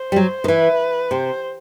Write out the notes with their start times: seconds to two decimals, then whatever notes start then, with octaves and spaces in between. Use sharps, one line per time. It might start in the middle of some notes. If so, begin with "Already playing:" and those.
Already playing: C5
0.12 G3
0.16 F#3
0.44 D#3
0.48 E3 B4
1.11 C3 C5